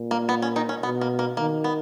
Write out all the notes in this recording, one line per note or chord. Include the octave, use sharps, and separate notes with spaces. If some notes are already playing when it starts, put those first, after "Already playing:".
Already playing: A#2
A#3
B3
C#4
D#3 D#4
C#4
B2 B3
A#3
A#3
D#3 A#3
B3